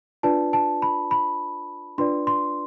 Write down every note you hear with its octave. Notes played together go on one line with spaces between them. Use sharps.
D4 F4 B4 D5 A5
A5
B5
B5
D4 F4 B4 D5 C6
C6